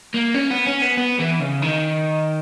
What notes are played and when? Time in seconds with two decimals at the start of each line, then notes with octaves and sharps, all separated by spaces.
0.14 A#3
0.34 C#4
0.50 B3
0.66 C#4
0.82 B3
0.98 B3
1.20 E3
1.40 C#3
1.62 D#3